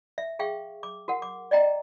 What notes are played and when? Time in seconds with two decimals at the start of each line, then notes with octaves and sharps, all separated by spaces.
0.18 E5
0.39 G#4 E5 F5 G5 C#6
0.83 D6
1.08 F#4 A#4 F#5
1.22 D6
1.51 D5 D#5 G5 A#5